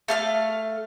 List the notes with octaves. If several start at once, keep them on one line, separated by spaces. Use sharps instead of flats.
A3 F5 F6